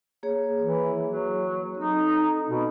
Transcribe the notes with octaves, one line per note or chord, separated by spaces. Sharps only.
A#3 G#4 C#5
E3
F#3
C4 D#4 A4
B2